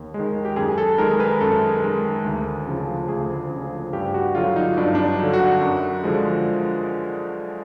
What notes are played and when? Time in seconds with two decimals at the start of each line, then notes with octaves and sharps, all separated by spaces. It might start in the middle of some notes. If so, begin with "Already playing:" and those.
Already playing: D#2 D#3
0.14 G#3
0.19 D#3
0.45 G4
0.56 F#2 G#4
0.78 A4
0.98 D#3 G#3 A#4
1.20 B4
1.41 F#2 A4
1.82 D#3 G#3
2.25 D2
2.67 C#3 F3
3.08 D2 G#4
3.51 C#3 F3
3.93 G2 G4
4.14 F#4
4.35 D3 F#3 F4
4.56 D#4
4.77 G2 D4
4.87 D#4
4.95 D4
5.19 D3 F#3
5.34 F#4
5.61 F#2
6.04 D3 F3 G#3